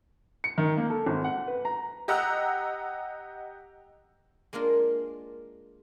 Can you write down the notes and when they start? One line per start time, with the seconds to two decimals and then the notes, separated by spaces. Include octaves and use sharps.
0.44 C#7
0.58 D#3
0.77 A#3
0.90 A4
1.06 G#1
1.24 F#5
1.47 B4
1.65 A#5
2.08 G4 D#5 F#5 A#5 E6 F#6
4.53 G#3 A#3 D4 F4 A#4